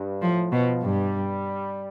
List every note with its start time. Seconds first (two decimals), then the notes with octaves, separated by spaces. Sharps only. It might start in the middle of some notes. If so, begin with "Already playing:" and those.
Already playing: G2
0.21 A2 F3
0.52 B2 F3
0.82 G2 G3